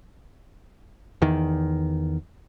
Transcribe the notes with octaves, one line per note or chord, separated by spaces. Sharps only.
E2 D#3